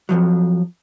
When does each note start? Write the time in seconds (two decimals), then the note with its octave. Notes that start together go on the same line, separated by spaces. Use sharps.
0.09 F2 C3 F3 F#3